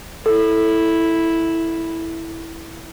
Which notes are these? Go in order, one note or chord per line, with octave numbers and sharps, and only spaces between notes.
E4 A4